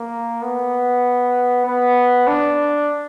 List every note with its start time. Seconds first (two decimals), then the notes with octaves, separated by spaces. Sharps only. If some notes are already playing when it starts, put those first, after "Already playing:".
Already playing: A#3
0.42 B3
1.66 B3
2.27 D4